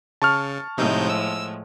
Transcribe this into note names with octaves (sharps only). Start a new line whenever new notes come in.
C#3 A5 C#6 F6
A2 C3 F3 G#3 D#4 G6
E6